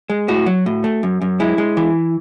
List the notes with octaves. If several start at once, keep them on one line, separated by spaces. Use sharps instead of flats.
G#3
A2 F#4
F#3
A2
A3
F#2
F#2
G#3 E4
G#3
E3